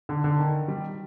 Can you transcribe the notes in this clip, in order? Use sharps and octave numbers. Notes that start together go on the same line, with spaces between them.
D3
D3
D#3
G3